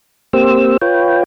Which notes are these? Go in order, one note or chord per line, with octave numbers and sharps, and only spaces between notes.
A#3 C4 G4 C5 E6
F4 B4 C#5 G5